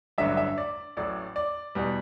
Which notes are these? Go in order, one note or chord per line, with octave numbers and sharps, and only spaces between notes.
A1 G2 D3 F#3 E5
E5
D5
A1 A2 F#3 D5
D5
E2 B2 G3